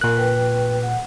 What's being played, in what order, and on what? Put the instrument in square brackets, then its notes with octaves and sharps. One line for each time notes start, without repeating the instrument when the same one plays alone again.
[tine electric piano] A#2 F#6 [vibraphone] A#4
[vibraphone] B4 G5
F#5